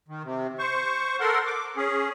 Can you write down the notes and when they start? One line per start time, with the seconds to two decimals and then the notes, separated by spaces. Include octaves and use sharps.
0.08 D#3
0.24 C3
0.59 C5 C#6
1.20 A4 A#4 F#5 C6
1.47 D6
1.76 C#4 G#4